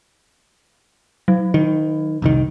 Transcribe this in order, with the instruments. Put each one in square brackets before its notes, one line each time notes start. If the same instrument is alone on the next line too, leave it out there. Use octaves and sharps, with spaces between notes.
[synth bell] F#3
[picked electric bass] D#3
F1 C2 D#3